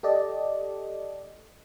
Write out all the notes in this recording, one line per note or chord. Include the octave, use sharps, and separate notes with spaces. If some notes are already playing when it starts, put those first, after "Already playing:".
G4 A4 D5 D#5